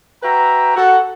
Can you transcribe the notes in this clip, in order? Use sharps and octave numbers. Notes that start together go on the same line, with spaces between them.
F#4 B4 E5 G5 A#5
F#4 A4 F#5